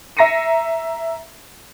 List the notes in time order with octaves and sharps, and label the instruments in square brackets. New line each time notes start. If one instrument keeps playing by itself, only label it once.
[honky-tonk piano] E5 A#5 A#6 C7 C#7 D#7